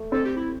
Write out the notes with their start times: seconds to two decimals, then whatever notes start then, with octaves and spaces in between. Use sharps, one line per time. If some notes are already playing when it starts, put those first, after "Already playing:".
Already playing: A3
0.12 C4 A4
0.25 G4
0.36 E4